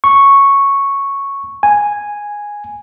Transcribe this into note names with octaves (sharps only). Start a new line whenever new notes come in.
C#6
G#5